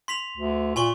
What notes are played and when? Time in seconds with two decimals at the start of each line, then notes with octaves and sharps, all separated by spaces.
0.08 C6 B6 F7
0.38 D2
0.76 A#2 G#5 C6 C#6